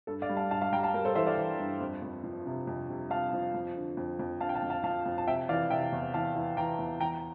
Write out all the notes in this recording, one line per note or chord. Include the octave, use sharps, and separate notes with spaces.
G2 A4
D5 F5
G3
F5 A5
G2 F5 A5
F5 A5
G3 G5 A#5
F5 A5
G3 A#4
A4 C5
E3 C5 E5
D5 F5
E3
G2
F2
F2
F3
C3
F2
C3
F3 F5 A5
F3
F2
D3
F2
F2
D3 F5 A5
G5
F5 A5
F2
F5 A5
F3 F5 A5
F2
A5
C3 E5 G5
E3 D5 F5
C3 E5 G5
E2
E3 F5 A5
E3
E3 G5 A#5
E2
E3 G5 A#5